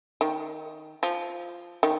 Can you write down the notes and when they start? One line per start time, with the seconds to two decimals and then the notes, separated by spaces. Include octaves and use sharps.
0.21 D#3
1.03 F3
1.83 D#3